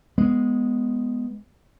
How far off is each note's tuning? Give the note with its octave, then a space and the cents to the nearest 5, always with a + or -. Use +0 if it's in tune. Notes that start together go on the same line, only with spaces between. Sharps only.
G#3 +0 B3 +0